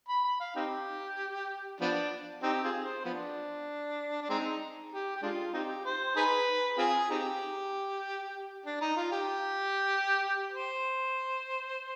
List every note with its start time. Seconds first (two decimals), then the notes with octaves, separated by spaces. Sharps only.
0.09 B5
0.24 B5
0.40 F5
0.56 C4 D#4 G4
1.81 F3 B3 D4
2.42 C4 D#4 G4
2.64 C4 F4 G#4
2.84 C5
3.05 F3 B3 D4
4.21 D4
4.30 G#3 C4 D#4
4.92 G4
5.16 G4
5.23 G#3 D4 F4
5.54 C4 D#4 G4
5.85 C5
6.16 D#4 G#4 B4
6.78 C4 F4 G#4
7.10 C4 D#4 G4
8.65 D4
8.81 D#4
8.96 F4
9.12 G4
10.52 C5